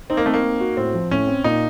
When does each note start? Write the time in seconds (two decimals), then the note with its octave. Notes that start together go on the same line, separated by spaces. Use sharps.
0.10 C4 D#4
0.17 A#3
0.26 A3 C4
0.34 A#3
0.44 D#4
0.61 F#4
0.77 A2 C4
0.95 F3
1.11 A2 C#4
1.27 C4
1.44 A#2 D#4